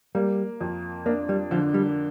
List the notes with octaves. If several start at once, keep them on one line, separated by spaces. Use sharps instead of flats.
G3 A#3
F2
A#3 D4
G3
D3 F3
G3